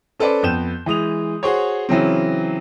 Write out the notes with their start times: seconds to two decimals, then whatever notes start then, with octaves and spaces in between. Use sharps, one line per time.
0.19 C#4 A4 B4 C5 D5
0.43 F2 B3 G6 E7
0.86 E3 G#3 D#6 F7
1.43 F#4 G#4 C5 C#5
1.89 C#3 E3 F#3 C4